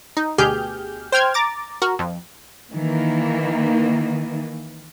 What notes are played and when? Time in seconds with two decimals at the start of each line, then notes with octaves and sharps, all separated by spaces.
0.17 D#4
0.38 D2 B2 G4 G#4 F6 G6
1.12 C5 G5 F6 G#6
1.34 A#5 D6 A6
1.82 F#4 A#4
1.99 F2
2.73 D#3 E3 A#3